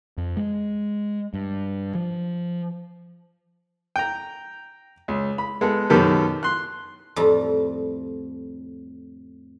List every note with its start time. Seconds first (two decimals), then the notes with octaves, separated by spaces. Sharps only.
0.18 F2
0.37 G#3
1.34 G2
1.95 F3
3.96 G5 A#5
5.08 C#2
5.38 B5
5.61 G#3 B3 A4
5.90 F#2 B2 D#3 G4 A4 B4
6.43 C6 F#6
7.16 F2 A2 G3 A#5